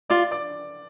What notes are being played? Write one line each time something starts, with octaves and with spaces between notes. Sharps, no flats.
F4 D5 D6
D5 D6